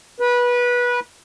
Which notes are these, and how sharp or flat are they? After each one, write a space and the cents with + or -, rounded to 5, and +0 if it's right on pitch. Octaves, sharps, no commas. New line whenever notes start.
B4 -20